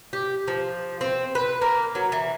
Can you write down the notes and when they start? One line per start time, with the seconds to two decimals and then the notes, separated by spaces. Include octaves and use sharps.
0.13 G4
0.48 F3
1.01 C4
1.35 B4
1.62 A#3
1.95 F#3
2.12 E3